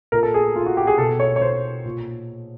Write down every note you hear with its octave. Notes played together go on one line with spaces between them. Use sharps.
A#2 A#4
A4
G#4
F4
F#4
G4
G#4
B2 A4
C#5
C#5
C5
A#2